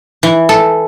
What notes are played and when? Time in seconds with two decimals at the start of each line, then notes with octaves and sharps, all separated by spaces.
0.23 E3
0.49 A4